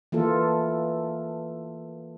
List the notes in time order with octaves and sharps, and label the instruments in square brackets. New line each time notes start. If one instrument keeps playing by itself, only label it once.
[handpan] E3 A#3 F4 A4